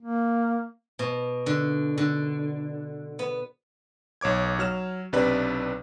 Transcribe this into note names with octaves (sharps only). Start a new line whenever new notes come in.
A#3
B2
D3
D3
B3
B1 C#5 D6 G#6
F#3 F6 E7
B1 C3 D4 B4 D5 B6